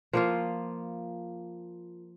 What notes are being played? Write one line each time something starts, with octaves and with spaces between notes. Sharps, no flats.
F3 A#3 F4